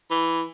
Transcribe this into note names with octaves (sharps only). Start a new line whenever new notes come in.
E3